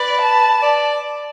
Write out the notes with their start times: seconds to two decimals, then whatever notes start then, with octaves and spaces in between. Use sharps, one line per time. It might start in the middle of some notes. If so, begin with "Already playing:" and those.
Already playing: B4 D5
0.21 A5
0.62 D5